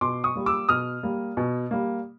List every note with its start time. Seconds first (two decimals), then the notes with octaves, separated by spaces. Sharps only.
0.01 B2 C6 D6
0.24 C#6 D#6
0.35 G3 A#3
0.46 D6 E6
0.69 B2 D#6 F6
1.03 G3 A#3
1.37 B2
1.71 G3 A#3